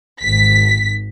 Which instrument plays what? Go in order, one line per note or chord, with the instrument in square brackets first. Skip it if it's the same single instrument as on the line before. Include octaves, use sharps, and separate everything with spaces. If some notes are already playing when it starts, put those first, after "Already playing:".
[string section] G#1 B6